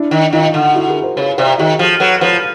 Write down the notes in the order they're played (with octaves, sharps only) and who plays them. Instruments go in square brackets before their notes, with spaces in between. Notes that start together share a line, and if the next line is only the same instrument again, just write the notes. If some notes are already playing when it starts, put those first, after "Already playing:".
Already playing: [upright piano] D4 E4
[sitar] D#3
[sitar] D#3 [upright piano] D#4 F4
[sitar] D3
[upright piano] E4 F#4
G#4 A#4
A#4 C5
[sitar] C#3 [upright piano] B4 C#5
[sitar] C3 [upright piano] C5 D5
[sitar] D#3 [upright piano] F#4 G#4
[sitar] F3 [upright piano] G4 A4
[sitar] F#3 [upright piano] A4 B4
[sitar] F3 [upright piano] B4 C#5